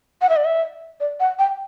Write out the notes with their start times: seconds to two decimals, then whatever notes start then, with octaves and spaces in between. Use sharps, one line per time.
0.22 F#5
0.29 E5
0.36 D5
0.45 E5
1.00 D5
1.20 F#5
1.39 G5